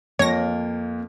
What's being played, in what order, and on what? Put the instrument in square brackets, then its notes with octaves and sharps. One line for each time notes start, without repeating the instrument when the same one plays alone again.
[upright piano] F2 [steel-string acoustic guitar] A#3 F4 [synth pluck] C#5 A#6